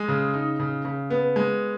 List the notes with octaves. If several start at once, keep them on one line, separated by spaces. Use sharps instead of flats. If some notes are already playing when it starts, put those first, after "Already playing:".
Already playing: G#3
C#3
D#4
C#3
C#3
B3
G#3